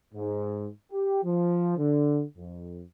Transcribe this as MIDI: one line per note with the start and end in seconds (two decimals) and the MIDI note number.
0.14 0.67 44
0.92 1.20 67
1.24 1.75 53
1.78 2.23 50
2.37 2.82 41